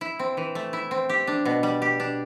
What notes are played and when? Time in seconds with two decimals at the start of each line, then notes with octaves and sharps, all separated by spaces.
0.01 E4
0.19 C4
0.37 E3
0.55 A3
0.73 E4
0.91 C4
1.09 G4
1.27 D4
1.45 B2
1.63 G3
1.82 G4
2.00 D4